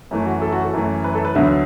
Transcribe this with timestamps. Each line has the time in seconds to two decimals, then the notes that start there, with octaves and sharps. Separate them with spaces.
0.11 F#2 E3 A3
0.26 F#4
0.42 A4
0.52 F#4
0.63 A4
0.73 F#2 E3 A3
1.04 B4
1.15 A4
1.25 B4
1.35 D2 D3 F#3 B3 E5